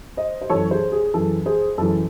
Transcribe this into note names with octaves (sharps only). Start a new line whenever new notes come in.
C5 D#5
C5
F#2 E3 A4 C#5
G#4 C5
G#4
F#2 E3 A4
G#4 C5
F#2 E3 A4